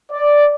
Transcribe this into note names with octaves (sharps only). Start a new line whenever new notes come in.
D5